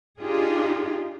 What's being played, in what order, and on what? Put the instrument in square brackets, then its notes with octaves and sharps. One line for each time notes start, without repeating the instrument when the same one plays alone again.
[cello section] D4 D#4 F4 G4 G#4